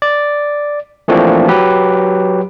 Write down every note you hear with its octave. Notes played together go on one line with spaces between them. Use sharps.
D5
E3 F3 A3 A#3 C4 D4
F#3 G4 B4